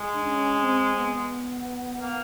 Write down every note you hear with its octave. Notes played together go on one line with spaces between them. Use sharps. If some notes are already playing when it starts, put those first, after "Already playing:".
Already playing: G#3
D4
C#4
C4
B3
A#3